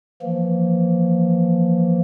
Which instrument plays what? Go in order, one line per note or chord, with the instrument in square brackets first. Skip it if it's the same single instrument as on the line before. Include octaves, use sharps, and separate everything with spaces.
[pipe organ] E3 F3 A#3